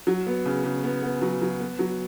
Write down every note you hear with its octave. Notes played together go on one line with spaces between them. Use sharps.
F#3
B3
C#3
C#3
B3
B3
F#3
F#3
B3
F#3